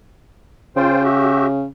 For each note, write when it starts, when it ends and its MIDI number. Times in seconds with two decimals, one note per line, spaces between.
0.76 1.65 49
0.76 1.03 65
0.76 1.03 72
0.76 1.03 79
1.03 1.47 66
1.03 1.47 67
1.03 1.47 76